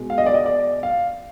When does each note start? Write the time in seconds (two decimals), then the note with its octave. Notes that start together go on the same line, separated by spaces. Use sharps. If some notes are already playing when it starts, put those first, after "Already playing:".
Already playing: B2 G#3
0.10 F5
0.18 D#5
0.26 D5
0.34 D#5
0.46 D5
0.83 F5